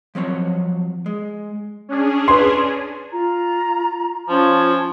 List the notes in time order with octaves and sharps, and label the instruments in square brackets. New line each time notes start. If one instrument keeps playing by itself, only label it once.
[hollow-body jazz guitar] F3 F#3 C4 C#5
G#3
[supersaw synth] C#4 D4 G#4
[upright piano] B4 C6
[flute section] F4 A#5
[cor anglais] F3 [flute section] C#4 F4 A5